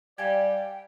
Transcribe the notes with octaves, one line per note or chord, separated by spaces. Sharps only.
G3 D5 F5 G5 G#5 G#6